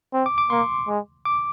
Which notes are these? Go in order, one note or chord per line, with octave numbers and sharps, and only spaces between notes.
C4
D6
D6
A#3 C6
G#3
D6